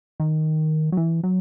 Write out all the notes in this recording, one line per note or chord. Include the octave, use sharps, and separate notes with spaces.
D#3
F#3
E3
F#3